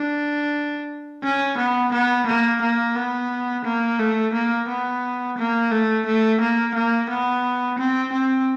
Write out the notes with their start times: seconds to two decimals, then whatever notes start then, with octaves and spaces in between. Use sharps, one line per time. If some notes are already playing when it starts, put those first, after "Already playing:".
Already playing: D4
1.23 C#4
1.58 B3
1.92 B3
2.27 A#3
2.62 A#3
2.96 B3
3.65 A#3
3.99 A3
4.34 A#3
4.68 B3
5.38 A#3
5.72 A3
6.06 A3
6.41 A#3
6.75 A#3
7.10 B3
7.79 C4
8.13 C4